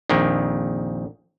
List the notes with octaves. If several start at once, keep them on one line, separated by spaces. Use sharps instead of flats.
A#1 F2 D#3